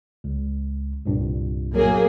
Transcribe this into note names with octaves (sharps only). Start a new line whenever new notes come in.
C#2
C2 G2 A#2
F#3 A#3 G#4